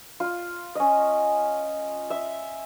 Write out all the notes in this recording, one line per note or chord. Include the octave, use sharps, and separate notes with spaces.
F4
C#4 D#5
E5